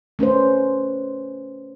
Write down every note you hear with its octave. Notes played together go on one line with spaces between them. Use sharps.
A3 C#4 B4 C5